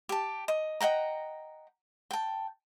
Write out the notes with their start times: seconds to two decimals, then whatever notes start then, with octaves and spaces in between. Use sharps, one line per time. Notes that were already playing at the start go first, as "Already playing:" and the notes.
0.09 G4 A5
0.48 D#5
0.81 D#5 F#5 G5 A#5
2.11 G5 A5